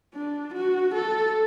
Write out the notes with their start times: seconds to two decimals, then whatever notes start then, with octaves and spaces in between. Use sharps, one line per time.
0.14 D4
0.54 F#4
0.94 A4